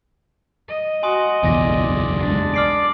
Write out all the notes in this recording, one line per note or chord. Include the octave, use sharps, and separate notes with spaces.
D#5
F#4 G#5 C6 D#6
F#1 B1 E2 D5 G#5 A#6
G#3 D4
D5 F6 C7 D7